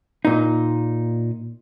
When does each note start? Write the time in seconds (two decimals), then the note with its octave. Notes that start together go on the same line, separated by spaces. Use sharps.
0.25 A#2 D#4